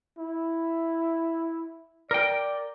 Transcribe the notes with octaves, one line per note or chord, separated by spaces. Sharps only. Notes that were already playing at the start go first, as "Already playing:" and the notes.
E4
A#4 D5 G5